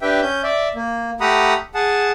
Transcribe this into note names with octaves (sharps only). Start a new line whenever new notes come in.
D4 G4 B4 E5 G5
C#4 G6
D5 E5
A#3
A3 G4 F#5 A#5 B5 D#6
G#4 F#5 A5